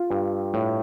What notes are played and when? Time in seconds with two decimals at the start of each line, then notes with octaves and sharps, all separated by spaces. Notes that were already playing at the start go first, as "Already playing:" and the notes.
Already playing: F4
0.10 G2
0.54 A2